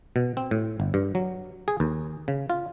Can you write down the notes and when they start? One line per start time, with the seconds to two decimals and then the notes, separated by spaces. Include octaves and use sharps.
0.16 B2
0.37 C4
0.51 A2
0.80 G1
0.94 G2
1.15 F#3
1.68 G#4
1.80 D#2
2.28 C#3
2.50 F4